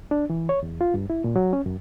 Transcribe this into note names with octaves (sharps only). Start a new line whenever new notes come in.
D4
E3
C#5
E2
F4
G2
E4
A#2
F#3
C#4
F#2